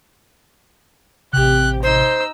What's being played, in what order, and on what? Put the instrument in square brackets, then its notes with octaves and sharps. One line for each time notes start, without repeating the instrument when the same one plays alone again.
[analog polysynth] A1 C3 [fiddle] G4 [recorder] F#6
[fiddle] D#4 E6 [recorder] C5